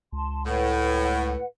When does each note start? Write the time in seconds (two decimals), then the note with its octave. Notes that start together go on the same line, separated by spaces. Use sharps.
0.13 C#2 A5 C6
0.46 A2 B4 F#5